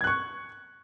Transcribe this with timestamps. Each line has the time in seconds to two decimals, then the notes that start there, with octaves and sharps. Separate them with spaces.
0.01 G#6
0.04 F#6
0.07 C#6